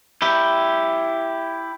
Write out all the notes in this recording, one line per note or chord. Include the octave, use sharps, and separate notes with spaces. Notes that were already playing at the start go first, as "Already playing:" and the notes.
E4 G4